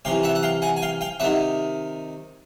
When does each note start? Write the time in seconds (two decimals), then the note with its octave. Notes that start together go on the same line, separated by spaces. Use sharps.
0.05 C3 E3 F5 G5
0.23 E5 F#5
0.35 F#5
0.43 F5 G5
0.62 F#5 G#5
0.77 G#5
0.82 F5 G5
1.01 F5 G5
1.20 C3 E5 F#5
1.23 D#3